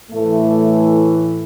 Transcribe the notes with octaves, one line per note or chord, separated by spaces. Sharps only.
A2 E3 A3